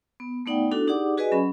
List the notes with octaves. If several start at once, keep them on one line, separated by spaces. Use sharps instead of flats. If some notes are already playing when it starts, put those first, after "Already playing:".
B3
A3 B3 D#4 D5 F#5 G5
D4 E4 F#4 A4
D#4 G4 G#4 D5 F#5 D6
F#4 G#4 B4 D5 D#5 G#5
F#3 C#4 B5